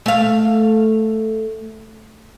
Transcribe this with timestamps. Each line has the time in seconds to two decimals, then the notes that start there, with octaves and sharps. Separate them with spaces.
0.06 A3 F5